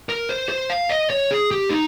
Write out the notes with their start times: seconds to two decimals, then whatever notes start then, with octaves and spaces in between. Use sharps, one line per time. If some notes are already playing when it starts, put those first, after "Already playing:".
0.09 A#4
0.29 C5
0.49 C5
0.70 F5
0.90 D#5
1.10 C#5
1.31 G#4
1.51 G4
1.70 D#4